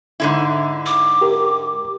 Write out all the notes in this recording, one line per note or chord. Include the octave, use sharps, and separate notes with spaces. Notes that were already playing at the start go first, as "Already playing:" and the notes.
G#2 D3 E4
D6
G4 A#4